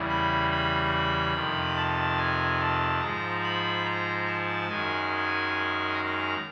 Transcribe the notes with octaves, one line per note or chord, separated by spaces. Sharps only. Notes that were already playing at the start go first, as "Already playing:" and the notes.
Already playing: E2 C#3 E3 G3
B5
B5
F2 C3 D#3
A5
G#5
A5
G#2 F3 G#3 A#5
B5
A#5
A5
F#2 D#3 G#3 G#5
A#5